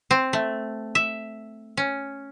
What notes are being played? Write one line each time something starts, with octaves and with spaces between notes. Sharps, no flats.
C4
A3
E5
C#4